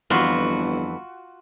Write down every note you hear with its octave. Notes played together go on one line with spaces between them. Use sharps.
G1 F2 E3 F4 F#4